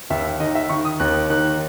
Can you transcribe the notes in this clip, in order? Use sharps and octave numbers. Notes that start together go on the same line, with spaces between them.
D#2 E5
D#3 D#5
E5
D#3 C#6
D#6
D#2 F#6
D#3 F#6